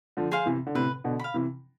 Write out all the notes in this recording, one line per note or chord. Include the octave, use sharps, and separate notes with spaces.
D3 F3
G#4 C5 F5
C3 E3
D3
A2 C3 B4
B2 D3
F5 B5
C3 E3